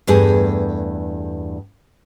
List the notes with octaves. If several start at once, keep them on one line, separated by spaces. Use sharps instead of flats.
E2 G2 A3 G#4